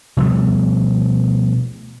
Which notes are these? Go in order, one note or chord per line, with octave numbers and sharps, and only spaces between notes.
B2 F3 G3 A3